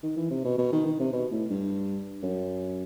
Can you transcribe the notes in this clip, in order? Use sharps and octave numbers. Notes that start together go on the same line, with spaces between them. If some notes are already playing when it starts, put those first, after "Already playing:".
D#3
E3
C3
B2
B2
D#3
D#3
C3
B2
A2
G2
F#2